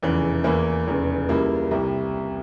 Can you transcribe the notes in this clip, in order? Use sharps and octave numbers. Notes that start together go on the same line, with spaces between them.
F1 E2 C#3 E3
E2 E3 A#3 E4
F1 E2 C#3
C#2 C#3 G3 A#3 E4
C2 C3 G3